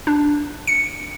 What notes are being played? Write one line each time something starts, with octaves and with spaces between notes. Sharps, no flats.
D4
C#7